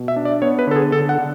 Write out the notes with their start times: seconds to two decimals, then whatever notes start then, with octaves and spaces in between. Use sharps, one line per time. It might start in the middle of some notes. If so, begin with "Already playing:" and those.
Already playing: B2
0.08 E5
0.16 D4
0.25 D5
0.42 B3 C#5
0.59 B4
0.67 D3 A4
0.76 G#4
0.92 D3 A4
1.09 F#5
1.18 D3